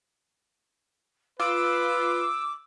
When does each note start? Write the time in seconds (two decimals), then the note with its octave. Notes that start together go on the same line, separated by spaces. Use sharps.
1.40 F4 B4 D6 E6